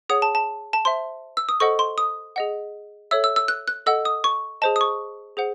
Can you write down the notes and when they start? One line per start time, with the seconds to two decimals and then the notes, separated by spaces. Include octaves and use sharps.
0.09 G#4 C#5 F#5 D#6
0.22 A5
0.35 A5
0.73 A5
0.85 C5 E5 C6
1.37 E6
1.49 D#6
1.60 A4 C5 D#5 F#5 C#6
1.79 C6
1.98 D#6
2.36 G#4 D#5 F#5
3.11 A4 C#5 E5 E6
3.24 E6
3.36 E6
3.48 F#6
3.68 F#6
3.86 A4 D#5 F#5 E6
4.05 D#6
4.24 C#6
4.62 G#4 C5 D#5 A5
4.76 D#6
4.81 C#6
5.37 G#4 C5 F#5